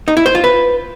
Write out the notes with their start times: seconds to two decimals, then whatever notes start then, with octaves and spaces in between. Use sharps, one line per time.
0.08 D#4
0.17 E4
0.26 C5
0.35 F4
0.44 B4